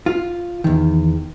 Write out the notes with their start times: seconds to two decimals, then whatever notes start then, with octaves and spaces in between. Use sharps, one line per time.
0.06 F4
0.64 E2 D#3